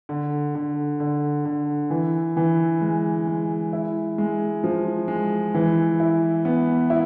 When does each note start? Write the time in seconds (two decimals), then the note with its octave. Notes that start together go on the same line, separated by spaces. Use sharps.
0.09 D3
0.55 D3
1.00 D3
1.45 D3
1.90 E3
2.37 E3
2.81 G#3
3.27 G#3
3.73 E4
4.18 G#3
4.64 F3
5.08 G#3
5.54 E3
6.00 E4
6.45 B3
6.90 E4